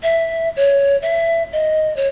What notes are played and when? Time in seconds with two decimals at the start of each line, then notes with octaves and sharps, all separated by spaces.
0.03 E5
0.56 C#5
1.02 E5
1.52 D#5
1.96 C#5